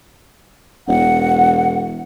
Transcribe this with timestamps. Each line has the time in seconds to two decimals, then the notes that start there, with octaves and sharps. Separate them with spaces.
0.88 E1 F#5